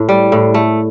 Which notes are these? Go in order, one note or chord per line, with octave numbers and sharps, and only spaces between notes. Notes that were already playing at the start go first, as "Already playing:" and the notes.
Already playing: A2
G3
A2
A3